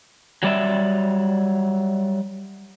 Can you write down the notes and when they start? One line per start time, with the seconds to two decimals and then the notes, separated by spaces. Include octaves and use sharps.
0.43 F#3 G3 D5 E5